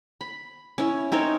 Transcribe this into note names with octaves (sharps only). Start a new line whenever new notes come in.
B5
C#4 E4
C4 D#4 A#4 C#5